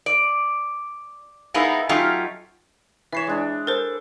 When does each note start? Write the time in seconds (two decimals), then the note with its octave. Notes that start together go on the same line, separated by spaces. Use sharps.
0.06 D5
1.54 G#3 A#3 B3 D#4 E4
1.89 F#3 A3 C#4 D#4 F4 G4
3.12 E3 C#5 E5 C7 E7
3.27 G#3 D4
3.67 A4 A#4 C5